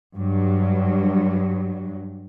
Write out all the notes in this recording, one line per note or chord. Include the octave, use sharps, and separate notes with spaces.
G2 F#3